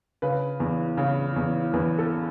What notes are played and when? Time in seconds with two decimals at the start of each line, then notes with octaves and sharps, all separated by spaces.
0.22 C#3 B4
0.60 E2
0.97 C#3
1.36 E2
1.73 E2 B4
1.98 A4